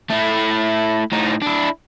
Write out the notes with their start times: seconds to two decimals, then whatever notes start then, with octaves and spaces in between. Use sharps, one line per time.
0.10 A3 E4
1.12 A2 D#4
1.42 D4 E4